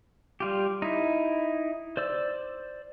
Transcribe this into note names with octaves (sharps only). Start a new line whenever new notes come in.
G3 F4 G4
D#4 E4
C5 D5 E6